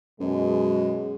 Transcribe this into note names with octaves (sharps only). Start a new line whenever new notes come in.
F#2 B2 G#3